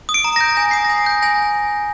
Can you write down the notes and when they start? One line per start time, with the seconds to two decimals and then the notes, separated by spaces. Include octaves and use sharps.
0.09 D#6
0.14 D7
0.24 A#5
0.36 G6 A#6
0.57 G#5 A#6
0.71 D#6 C7
0.85 G#5 A#6
1.06 G6
1.23 G#5 A#6